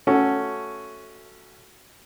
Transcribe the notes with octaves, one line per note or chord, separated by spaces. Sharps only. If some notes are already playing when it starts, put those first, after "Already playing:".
A3 C#4 F#4 A4